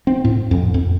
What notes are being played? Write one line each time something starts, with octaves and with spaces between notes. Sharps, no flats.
C4
A2
F2
F2